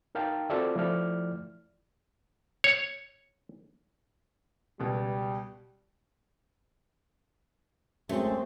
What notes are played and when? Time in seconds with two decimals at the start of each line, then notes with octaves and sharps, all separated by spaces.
0.15 D#4 A#4 F5 G5 A5
0.50 C4 F4 F#4 A4 D5 E5
0.76 F3 A3 E4 D5 F6
2.64 C#5
4.80 C#2 B2 G3
8.09 F#2 G#3 A3 C4